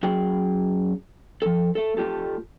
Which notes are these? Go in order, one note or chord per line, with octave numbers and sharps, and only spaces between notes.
F#2 F#4 G#4 G5
F3 A4
A3 A4
A3 F4 G4 A4